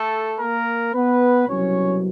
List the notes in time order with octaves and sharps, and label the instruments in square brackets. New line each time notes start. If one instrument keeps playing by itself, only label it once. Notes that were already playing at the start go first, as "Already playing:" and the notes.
Already playing: [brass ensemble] A3 A4
A#3 A#4
B3 B4
C2 B2 F#3 C#4 C#5